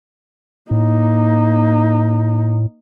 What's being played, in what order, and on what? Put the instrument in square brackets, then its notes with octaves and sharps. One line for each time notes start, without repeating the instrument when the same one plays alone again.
[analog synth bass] A2 [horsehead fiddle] A#3 D#4